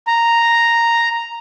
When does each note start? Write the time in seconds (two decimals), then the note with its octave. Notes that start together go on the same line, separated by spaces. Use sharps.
0.07 A#5